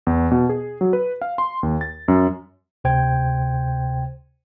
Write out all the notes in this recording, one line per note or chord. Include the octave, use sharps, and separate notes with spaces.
E2
B2
G#4
F#3
B4
F5
C6
D#2
A6
F#2
D2 C3 C5 G5 G#6